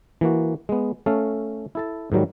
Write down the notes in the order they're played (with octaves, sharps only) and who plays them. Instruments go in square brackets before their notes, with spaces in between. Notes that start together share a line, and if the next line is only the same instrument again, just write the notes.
[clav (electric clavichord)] E3 A#3 F#4
G#3 B3
A3 C#4 A4 F5
E4 A4 A5
G#2 D#3 F#3 G3